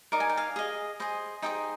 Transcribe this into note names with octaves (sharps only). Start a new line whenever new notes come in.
D#4 A#4 D5 A#5
G#5
G5
F5 G#5
G#4 D#5
G#4 C5 D#5
D#4 G#4 C5 D#5 G5